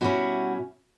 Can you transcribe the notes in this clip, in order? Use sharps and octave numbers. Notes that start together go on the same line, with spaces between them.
B2 G3 C#4 E4 F#4